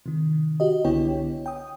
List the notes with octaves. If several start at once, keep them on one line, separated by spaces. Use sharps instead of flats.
C3 D#3
F#4 G4 D#5
C2 D3 B3 E4 C#5 G5
G5 D#6